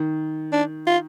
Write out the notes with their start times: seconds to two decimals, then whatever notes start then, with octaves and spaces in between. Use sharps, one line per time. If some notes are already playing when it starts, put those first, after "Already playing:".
Already playing: D#3
0.52 D4
0.87 F4